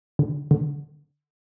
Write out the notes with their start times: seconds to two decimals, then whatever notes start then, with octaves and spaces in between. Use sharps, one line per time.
0.19 D3
0.51 D3